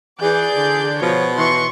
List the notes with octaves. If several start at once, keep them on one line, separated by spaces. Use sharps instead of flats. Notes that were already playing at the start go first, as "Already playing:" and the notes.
E3 G#4 D5 G6
D3
B2 F3 C#5
E3 C6 C#6 C#7